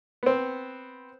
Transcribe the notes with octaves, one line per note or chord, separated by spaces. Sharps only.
B3 C4